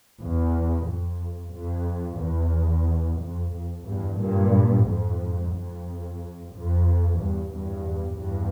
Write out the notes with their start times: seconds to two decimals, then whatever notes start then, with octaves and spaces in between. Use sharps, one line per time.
0.20 E2
0.87 F2
1.54 F2
2.19 E2
3.20 F2
3.52 F2
3.85 E2 G2
4.19 G2 A#2
4.86 F2 G#2
5.52 F2
6.52 F2
7.18 E2 G2
7.52 E2 G2
8.17 E2 G2